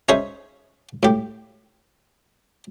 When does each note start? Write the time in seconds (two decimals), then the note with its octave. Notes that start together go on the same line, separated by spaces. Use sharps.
0.09 C#4 D#4 G#4 C5 C#5 E5
1.03 A2 G4